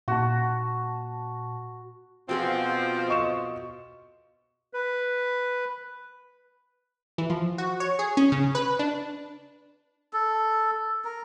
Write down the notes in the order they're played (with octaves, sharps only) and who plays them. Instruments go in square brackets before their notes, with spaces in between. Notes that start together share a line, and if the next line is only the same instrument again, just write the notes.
[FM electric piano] A#2 A5 [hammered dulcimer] F#4
[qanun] B2 G#4 F#5 [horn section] F3 C4 [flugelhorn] F4
[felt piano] D#5 C#6 E7
[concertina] B4
[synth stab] E3
F3
F#4
C#5
G#4
C#4
C#3
B4
D4
[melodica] A4
A#4